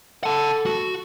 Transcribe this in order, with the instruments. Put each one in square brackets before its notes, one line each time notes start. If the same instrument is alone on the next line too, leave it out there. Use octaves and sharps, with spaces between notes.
[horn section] A4 [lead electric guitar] F#5 A5
[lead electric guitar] F#4